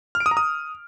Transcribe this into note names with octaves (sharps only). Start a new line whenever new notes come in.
F6
D7
D#6
A#5
D#6